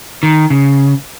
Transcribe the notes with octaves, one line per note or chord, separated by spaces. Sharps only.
D#3
C#3